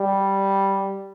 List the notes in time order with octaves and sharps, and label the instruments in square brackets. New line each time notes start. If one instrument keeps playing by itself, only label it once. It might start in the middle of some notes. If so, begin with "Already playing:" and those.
Already playing: [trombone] G3